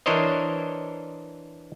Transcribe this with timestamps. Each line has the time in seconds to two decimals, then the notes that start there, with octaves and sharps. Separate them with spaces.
0.06 E3 D4 A#4 C5 C#5 D#5